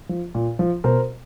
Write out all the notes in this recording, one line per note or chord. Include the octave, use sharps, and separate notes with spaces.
F3
A#2
F3
B2 A#4 C5